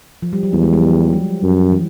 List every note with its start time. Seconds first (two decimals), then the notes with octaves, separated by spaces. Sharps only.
0.22 F3
0.33 G3
0.43 F#3
0.53 E2 G3
0.63 G#3
0.73 G3
0.79 F3
0.83 F#3
1.13 F3
1.43 F#2
1.72 E3